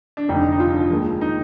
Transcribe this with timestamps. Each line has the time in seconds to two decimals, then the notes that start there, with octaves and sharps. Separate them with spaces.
0.17 D4
0.28 F1 F2 D3 G3 D#4
0.52 D#4
0.59 F3 F4
0.90 D#2 D#3 G#3
1.21 D#4